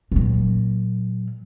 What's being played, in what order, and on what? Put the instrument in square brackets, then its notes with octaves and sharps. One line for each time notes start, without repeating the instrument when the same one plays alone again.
[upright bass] A#2 F#3